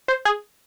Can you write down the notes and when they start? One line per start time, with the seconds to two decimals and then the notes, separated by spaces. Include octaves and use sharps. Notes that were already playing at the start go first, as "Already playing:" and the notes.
0.08 C5
0.25 G#4